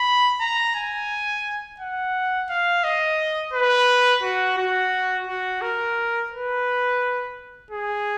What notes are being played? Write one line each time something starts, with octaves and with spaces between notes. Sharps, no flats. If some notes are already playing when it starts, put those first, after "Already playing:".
Already playing: B5
A#5
G#5
F#5
F5
D#5
B4
F#4
F#4
F#4
A#4
B4
G#4